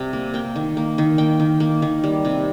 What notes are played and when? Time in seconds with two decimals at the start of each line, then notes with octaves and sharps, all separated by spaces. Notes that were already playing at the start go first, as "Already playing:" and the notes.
Already playing: C3 G3
0.13 A#3
0.34 A#3 G5
0.56 D#3
0.77 A#3
0.98 D#3
1.18 A#3 G5
1.39 D#3
1.60 A#3
1.82 D#3
2.04 G3
2.25 C3